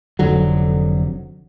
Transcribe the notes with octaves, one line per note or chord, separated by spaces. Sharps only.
F1 F2 D3 F#3